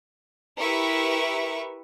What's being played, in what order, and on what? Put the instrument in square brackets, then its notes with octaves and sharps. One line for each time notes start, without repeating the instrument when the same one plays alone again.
[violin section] E4 G4 A#4 B4 E5 C#6